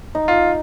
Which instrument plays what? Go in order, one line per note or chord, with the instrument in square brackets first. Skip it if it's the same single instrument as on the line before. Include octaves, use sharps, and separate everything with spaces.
[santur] D#4
[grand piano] F4